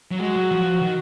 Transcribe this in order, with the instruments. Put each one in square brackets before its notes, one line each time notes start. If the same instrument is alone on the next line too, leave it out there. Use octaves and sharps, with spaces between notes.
[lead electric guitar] F#3
[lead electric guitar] G#3 [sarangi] F#4
[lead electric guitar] F#3
F3
D#3